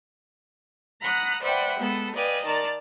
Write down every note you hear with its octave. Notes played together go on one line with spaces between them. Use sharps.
F#5 A#5 B5 D#6 F#6
B4 C5 D5 E5 F#5 G5
G#3 B3 A4
B4 D5 D#5 F5 G5 G#5
D#3 D5 A5 F6 A6